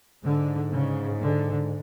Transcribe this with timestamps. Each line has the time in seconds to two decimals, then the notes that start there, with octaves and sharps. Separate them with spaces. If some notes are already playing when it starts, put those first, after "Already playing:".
0.23 G#2 D3
0.71 C#3
1.19 D3